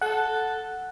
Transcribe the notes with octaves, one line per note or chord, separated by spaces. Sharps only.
A4 F#5